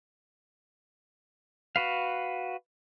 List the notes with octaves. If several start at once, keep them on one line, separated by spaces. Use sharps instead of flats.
F#4 B4 F5